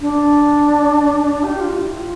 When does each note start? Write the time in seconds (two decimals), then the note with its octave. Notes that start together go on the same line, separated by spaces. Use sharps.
0.01 D4
1.44 G4
1.60 F4
1.76 E4
1.92 F4